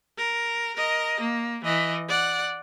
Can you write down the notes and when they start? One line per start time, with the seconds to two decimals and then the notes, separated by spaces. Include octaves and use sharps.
0.18 A#4
0.76 A#4 D#5
1.21 A#3
1.64 E3 D#5
2.08 D5 F#5